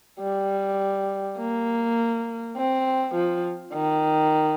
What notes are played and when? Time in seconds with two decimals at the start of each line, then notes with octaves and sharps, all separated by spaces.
0.20 G3
1.38 A#3
2.57 C4
3.15 F3
3.74 D#3